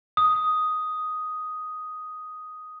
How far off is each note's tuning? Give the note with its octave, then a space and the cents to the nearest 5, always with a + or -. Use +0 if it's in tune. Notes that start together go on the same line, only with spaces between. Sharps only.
D#6 +5